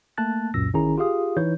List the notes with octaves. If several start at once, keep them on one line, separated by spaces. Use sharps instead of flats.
A3 A#3 A5 F#6 A6
C#2 F#2 A#2 E6 A#6
A1 D#3 C#4 E4 G#4 A#5
F4 G4 G#4 F5 D#6
E3 D#4 E4 C#5 G6